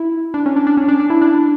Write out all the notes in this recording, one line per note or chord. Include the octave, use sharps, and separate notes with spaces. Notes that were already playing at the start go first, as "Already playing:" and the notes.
Already playing: E4
D4
C#4
D4
D4
C#4
D4
D4
E4
D4